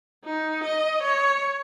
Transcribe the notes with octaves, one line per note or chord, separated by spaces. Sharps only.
D#4
D#5
C#5